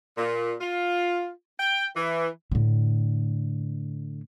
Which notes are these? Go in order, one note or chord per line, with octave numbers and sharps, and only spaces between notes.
A#2
F4
G5
E3
A2 D3